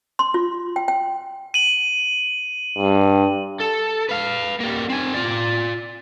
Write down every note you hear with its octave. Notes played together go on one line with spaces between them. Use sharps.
C6
F4
G5
G5
D#7 F#7
G2
A4
B4 F5
G3 A#3
C4 G#5
F4 D5